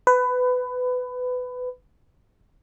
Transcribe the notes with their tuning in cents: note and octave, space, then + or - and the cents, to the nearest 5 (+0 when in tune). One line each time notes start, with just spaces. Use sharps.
B4 +20